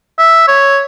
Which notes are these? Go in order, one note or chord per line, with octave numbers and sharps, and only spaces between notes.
E5
C#5